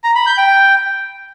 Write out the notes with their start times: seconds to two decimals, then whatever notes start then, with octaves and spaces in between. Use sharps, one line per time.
0.04 A#5
0.15 B5
0.26 G6
0.38 G5